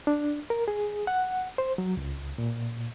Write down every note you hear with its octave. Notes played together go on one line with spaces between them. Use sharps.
D4
A#4
G#4
F#5
C5
F#3
C#2
A#2